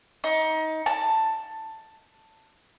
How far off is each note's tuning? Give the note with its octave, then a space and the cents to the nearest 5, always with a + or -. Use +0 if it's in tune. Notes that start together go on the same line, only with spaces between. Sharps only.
D#4 +25
A5 +10